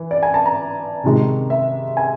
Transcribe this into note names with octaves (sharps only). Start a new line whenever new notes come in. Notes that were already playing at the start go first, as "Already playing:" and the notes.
Already playing: E3
D5
G#5
A5
A#5
C3 D#3 G#3
E5
G#5